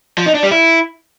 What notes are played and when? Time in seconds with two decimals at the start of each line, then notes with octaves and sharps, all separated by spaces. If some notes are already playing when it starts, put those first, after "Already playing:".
0.18 F3
0.26 D#4
0.35 D4
0.43 G3
0.51 E4